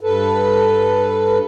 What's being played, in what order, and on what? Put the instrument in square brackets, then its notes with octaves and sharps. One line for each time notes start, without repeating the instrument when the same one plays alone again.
[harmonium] G2 A4 B4